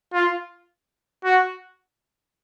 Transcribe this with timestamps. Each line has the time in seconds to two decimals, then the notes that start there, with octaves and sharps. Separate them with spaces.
0.13 F4
1.25 F#4